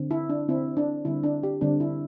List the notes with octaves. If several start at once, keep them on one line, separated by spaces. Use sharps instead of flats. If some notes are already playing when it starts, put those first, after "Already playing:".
Already playing: D3 C4
E4
D4
D3 C4 E4
D4
D3 G3 C4 E4
D4
G4
D3 G3 C4 D4
E4